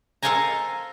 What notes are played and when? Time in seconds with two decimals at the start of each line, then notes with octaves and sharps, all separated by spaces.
0.23 A4 C5 F5 G5 G#5 A#5